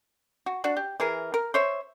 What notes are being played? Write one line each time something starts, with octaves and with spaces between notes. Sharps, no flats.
F#4
D4 F#4
G4
E3 G#4 A#4
A#4
C5 C#5 E5